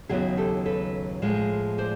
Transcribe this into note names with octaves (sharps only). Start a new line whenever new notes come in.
D#2 C#3 F#3 B3 E4 F#4 G#4
G4 A4
A4 B4
A2 F3 G#3
C5 D5